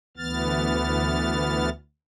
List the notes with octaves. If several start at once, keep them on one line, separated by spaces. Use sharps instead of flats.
D2 E3 B3 F6 A6